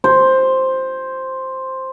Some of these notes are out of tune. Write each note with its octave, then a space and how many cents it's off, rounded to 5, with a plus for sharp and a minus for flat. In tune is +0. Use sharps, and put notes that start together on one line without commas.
C5 +5